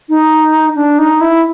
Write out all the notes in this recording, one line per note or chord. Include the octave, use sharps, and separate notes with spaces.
D#4
D4
D#4
E4